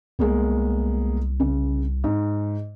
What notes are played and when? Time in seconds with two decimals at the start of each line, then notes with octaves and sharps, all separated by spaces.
0.19 C2 G#3 A#3 B3
1.40 C#3
2.04 G#2